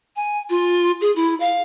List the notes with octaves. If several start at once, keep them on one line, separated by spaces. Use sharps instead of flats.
G#5
F4
G#4
E4
F5